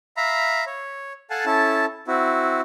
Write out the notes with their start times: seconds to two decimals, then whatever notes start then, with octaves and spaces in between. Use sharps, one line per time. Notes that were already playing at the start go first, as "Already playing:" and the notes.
0.17 E5 F5 A#5 B5
0.67 C#5
1.30 A4 F5 F#5 G#5 A5
1.46 C#4 E4 A4 A5
2.08 C4 E4 F#4